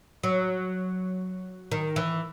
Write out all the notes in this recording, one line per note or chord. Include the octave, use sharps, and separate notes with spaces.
F#3
D#3
E3